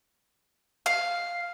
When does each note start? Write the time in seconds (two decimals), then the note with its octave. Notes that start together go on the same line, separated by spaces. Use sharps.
0.86 F5